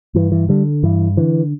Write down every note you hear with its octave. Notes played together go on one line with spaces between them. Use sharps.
G2 E3
E3
D3 G3
G2 E3
D3 E3